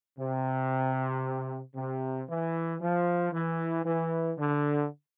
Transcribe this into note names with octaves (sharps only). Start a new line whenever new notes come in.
C3
C3
E3
F3
E3
E3
D3